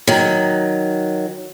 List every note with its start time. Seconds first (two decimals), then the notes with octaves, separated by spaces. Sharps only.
0.07 D#3 F#3